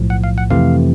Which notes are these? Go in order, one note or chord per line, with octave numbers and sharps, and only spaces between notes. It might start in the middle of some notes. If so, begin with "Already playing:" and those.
Already playing: B1 A2 F3
F#5
F5
F#5
F2 C3 E3 A3 F5